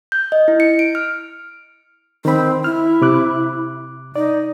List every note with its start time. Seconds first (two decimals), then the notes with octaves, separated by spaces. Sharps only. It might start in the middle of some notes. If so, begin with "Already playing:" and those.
0.12 G6
0.32 D#5
0.48 E4
0.60 C#7
0.79 D7
0.95 F6
2.25 D#3 C4 B5
2.64 E4 F6
3.02 C3 D6 F#6
4.16 D#4 D5